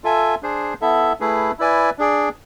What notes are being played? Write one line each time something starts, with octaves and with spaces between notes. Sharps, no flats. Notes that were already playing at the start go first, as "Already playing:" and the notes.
F4 A4 E5 G#5
D4 G#4 C5
B3 E4 A4 E5
A3 E4 G#4 B4
E4 B4 D5 G#5
D4 G#4 D5